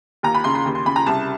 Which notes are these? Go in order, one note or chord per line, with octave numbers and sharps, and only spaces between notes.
D#2 A#5
B5
C#3 C6
C6
D#2
C6
C#3 B5
A#5
C2 A5